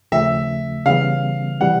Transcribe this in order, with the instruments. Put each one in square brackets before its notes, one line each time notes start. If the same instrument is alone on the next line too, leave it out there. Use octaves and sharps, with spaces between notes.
[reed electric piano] D#2 C#3 F3 A3 [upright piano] E5
[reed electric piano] C#3 E3 G3 B3 [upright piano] F5
[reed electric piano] C3 E3 G3 [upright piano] F#5